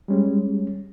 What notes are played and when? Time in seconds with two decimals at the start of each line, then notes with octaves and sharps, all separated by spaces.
0.08 G3 G#3 C#4